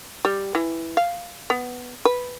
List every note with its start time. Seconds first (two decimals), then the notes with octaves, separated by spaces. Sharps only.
0.25 G3
0.55 E3
0.97 F5
1.50 B3
2.05 B4